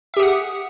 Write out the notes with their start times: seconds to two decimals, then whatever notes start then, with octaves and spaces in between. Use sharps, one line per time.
0.14 E5
0.17 G4
0.19 G#4
0.22 F#5